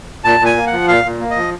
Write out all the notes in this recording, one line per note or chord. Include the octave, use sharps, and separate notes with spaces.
A#2 A5
A#2
G#5
A#3
F#5
F3
A#2 F5
A#2
A#3
F3 D#5